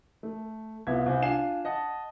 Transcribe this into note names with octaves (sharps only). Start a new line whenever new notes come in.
A3
C2 B3 F4 E5 G#6
C2 C5 G#5
D4 F4 G#5 C7 E7
D#5 F#5 A5